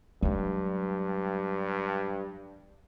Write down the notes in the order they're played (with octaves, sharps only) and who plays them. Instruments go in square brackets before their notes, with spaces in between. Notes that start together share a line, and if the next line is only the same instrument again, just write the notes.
[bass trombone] G2 [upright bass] F#3 G#3